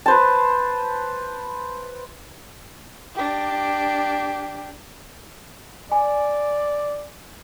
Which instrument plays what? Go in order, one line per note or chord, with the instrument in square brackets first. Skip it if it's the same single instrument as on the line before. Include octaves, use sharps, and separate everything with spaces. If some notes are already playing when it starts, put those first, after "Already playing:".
[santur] B4 C5 A5
[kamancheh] D4 G4
[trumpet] D5 [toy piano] G#5